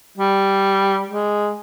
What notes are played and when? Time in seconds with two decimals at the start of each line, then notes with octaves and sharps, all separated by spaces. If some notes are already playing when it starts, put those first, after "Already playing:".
0.18 G3
1.10 G#3